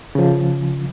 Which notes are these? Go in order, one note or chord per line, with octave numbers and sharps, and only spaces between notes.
C#3 F3